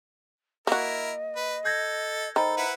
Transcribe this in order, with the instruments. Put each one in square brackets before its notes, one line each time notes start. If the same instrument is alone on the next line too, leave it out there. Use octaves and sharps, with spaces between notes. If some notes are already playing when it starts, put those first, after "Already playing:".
[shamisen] A#3 F#4 [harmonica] E4 A#4 [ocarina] D#5
[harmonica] B4
[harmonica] A4 [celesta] G6 G#6 A#6
[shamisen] D#3 [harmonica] A4 [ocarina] C5 [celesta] A#5 B5
[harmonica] E4 B4 F#5